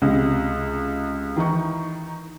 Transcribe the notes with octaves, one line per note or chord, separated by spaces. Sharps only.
C#2 C3
D#3 E3 D#4 C#6